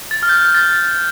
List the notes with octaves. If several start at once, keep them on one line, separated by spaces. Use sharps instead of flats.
A6
F6
G6
A6